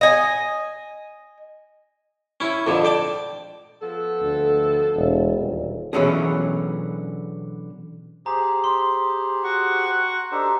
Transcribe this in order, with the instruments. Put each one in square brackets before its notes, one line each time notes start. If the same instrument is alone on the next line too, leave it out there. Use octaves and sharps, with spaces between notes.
[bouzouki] D#5 G#5
[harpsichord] C#4 E4
F2 D3 F3
D5 G5 A5
[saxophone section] F3 B3 A4
[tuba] D2
E1
D#1
[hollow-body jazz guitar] B2 D3 E3 F#3 C#4 G#4
[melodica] G4 G#4 C5 [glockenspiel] A#5
[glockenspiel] C6
[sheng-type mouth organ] F#4 F#5 C#6
[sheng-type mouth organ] D4 A4 [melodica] D#4 G4 C5